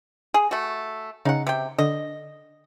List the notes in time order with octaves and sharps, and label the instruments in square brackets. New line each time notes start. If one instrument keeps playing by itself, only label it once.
[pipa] G#4
A3 F#4
[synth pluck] C#3 [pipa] D#4 F#5
[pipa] C3 G5
[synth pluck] D3 [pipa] D#5